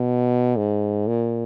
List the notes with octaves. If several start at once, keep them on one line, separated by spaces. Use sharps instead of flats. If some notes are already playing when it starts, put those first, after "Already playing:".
Already playing: B2
G#2
A#2